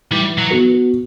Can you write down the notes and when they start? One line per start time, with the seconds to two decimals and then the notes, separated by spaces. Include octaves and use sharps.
0.11 E3 G3
0.38 F#3
0.51 B3 F#4 B4